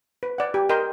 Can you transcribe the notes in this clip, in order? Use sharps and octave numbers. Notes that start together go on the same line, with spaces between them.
B4
D5 F#5
G4
A#4 D#5 G5 C6